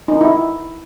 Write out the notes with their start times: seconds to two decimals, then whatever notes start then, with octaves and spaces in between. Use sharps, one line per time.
0.08 D#4
0.21 E4